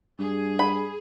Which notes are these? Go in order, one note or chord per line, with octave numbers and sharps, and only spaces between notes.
G2 G#4
B5